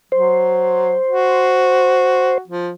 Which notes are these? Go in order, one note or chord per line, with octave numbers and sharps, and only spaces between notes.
F#3 C5
F#4
F3